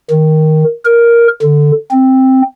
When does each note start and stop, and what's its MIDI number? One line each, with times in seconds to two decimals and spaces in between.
0.10 0.64 51
0.85 1.27 70
1.42 1.71 50
1.91 2.42 60